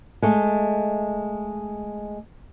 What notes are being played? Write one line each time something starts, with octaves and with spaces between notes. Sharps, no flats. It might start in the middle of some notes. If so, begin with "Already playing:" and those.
G#3 A3